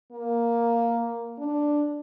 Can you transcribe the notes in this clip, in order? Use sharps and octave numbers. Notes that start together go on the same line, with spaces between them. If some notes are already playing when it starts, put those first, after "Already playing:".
A#3
D4